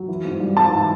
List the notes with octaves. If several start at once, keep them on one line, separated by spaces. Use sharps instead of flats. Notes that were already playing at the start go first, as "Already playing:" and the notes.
Already playing: F#3
E3
G#2
G3
G#2 A5
E3